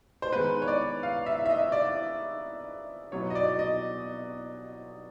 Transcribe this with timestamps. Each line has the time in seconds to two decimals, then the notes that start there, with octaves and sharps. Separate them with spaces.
0.22 C5
0.33 D#3 G#3 B3 B4
0.62 C#5
0.68 D5
1.03 F5
1.26 E5
1.46 E5
1.50 D#5
1.72 D5
3.12 B2 F#3 B3 C#5
3.30 D#5
3.35 D5
3.59 D#5